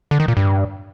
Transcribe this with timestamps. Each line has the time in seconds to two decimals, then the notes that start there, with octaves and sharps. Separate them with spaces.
0.11 D3
0.20 D#3
0.28 A#2
0.37 G2